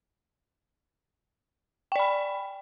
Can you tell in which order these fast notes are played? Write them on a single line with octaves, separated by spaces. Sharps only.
G5 D5 B5